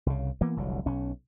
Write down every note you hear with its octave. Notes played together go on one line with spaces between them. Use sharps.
C2 C#3
E3 A#3 B3
F1 C2 D3 F#3
B1 C#4